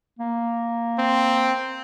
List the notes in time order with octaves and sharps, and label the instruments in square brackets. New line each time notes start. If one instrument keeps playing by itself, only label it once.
[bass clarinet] A#3
[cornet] C4